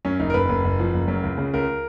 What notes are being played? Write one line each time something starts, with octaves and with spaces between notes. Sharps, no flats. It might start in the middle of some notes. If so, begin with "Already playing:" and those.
F#2 C#4
F#1 D#4
A#4
F#1 B4
F#1
F#1
F3
F#1
F#2
C#2
C#3
C#2 A#4